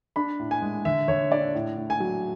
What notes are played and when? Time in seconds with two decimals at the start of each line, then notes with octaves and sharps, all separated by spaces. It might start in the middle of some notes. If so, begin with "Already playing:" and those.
0.16 D4 B5
0.39 A2
0.51 G#5
0.62 G#3
0.85 D3 E5
1.08 D3 C#5
1.32 D4 D5
1.55 A2
1.77 A2
1.90 G#5
2.00 F#3